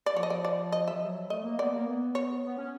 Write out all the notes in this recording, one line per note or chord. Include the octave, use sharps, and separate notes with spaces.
D5
F3 C#5
D#5
D5
D5
D#5
F3 E5
F#3
A3 D#5
A#3
B3 D5
A#3
B3
C#5
B3
C#4